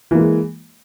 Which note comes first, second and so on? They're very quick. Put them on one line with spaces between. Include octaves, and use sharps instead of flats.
E3 A#3 G#3